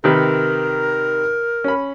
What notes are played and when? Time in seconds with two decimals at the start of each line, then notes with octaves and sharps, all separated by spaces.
0.04 C3 D#3 A#4 B4
1.64 C#4 B5